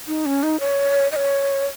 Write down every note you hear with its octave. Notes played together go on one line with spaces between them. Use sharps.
D#4
C#4
D#4
C#5
D#5
C#5